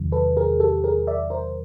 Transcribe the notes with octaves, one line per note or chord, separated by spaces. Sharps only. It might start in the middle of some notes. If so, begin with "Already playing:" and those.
Already playing: E2 C3 D#3 F#3
A4 B4
G#4 A#4
G4 A4
G#4 A#4
D5 E5
A#4 C5